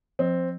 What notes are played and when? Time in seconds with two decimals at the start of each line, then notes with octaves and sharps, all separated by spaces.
0.19 F3 C4